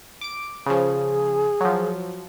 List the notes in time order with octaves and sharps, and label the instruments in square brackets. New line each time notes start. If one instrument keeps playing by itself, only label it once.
[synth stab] D6 D7
[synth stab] C#3 F3 [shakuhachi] G#4
[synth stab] F3 F#3